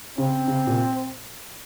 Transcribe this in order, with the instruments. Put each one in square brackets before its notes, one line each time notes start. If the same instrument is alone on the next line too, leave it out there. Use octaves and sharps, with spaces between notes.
[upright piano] C#3 [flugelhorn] C4
[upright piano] C#3
A#2